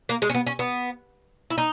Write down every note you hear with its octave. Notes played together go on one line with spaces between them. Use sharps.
A#3
G#3
C#4
B3
C#4
B3
E4
D#4